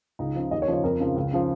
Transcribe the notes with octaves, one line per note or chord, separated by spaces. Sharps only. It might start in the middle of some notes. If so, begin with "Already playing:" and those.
C#2 D#4
C#3 F3
D#2 D#5
C#5
C#3 F3
C#5
F2 A#4
C#3 F3
C#2
C#3 F3